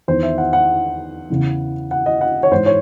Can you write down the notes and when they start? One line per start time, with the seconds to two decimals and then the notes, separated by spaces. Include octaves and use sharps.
0.08 E2 D#3 C5
0.23 E5
0.38 F#5
0.53 F#5
1.30 E2 C#3 E3
1.91 F#5
2.06 D#5
2.21 F#5
2.43 C#5
2.51 G#2 E3 C5
2.66 C#5